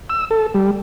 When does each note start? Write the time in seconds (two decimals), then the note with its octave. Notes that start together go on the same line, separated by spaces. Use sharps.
0.10 E6
0.31 A4
0.54 G3